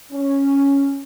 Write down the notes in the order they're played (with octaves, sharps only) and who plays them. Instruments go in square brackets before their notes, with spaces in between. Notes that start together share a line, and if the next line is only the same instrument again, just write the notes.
[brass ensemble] C#4